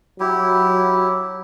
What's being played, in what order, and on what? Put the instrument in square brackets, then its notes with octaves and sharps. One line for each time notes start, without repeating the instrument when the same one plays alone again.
[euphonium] F#3 [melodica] E4 G4